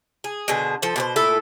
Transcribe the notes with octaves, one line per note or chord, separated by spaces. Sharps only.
G#4
B2 D3 G#4 C5
F3 A4 C5
B2 G#4 C5
A#2 A3 E4 A4